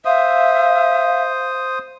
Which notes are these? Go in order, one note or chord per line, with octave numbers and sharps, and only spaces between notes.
C5 E5 F5 D#6